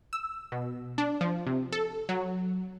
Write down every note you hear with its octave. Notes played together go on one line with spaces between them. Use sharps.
E6
B2
D4
F3
C3
A4
F#3